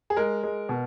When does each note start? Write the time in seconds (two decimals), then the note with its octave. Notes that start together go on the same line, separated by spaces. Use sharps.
0.10 G#4
0.16 G#3 A#4
0.43 G#3
0.69 B2